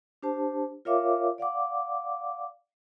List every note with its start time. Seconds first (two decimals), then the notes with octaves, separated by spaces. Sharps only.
0.23 D4 G4 C5 A5
0.85 F4 A#4 C#5 E5 F5 D6
1.38 D5 F5 F#5 D6